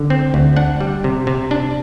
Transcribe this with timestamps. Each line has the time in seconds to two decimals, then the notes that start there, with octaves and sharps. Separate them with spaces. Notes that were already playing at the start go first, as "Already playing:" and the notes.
Already playing: D3
0.10 C4
0.34 D2
0.56 D4 F#5
0.80 G3
1.04 C3
1.27 C3
1.51 D4